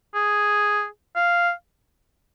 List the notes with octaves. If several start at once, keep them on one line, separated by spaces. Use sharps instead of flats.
G#4
F5